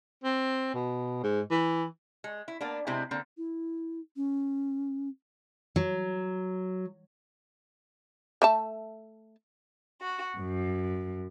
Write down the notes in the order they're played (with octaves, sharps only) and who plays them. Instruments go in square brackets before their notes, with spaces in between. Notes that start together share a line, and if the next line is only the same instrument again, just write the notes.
[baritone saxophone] C4
B2
G#2
E3
[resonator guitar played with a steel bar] G#3
E4
A#3 B3 D4
C3 G#3 C4 D4 E4
D3 A#3 C4
[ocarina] E4
C#4
[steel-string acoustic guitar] F#3
[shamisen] A3 E5 A5
[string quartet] F#4
F#2